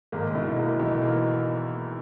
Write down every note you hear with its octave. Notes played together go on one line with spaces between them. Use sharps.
G#1 G#2 A#3
B1 B2 E4
A#3
B1 B2 E3
A#3